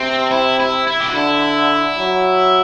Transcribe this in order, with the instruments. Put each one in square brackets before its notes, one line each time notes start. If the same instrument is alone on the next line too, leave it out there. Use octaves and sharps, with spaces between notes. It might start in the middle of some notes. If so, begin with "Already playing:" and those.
Already playing: [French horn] C3 [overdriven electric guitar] C4
[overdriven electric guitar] E4
E4
E4
G4
F#4
[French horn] D3 [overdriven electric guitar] E4
[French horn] F#3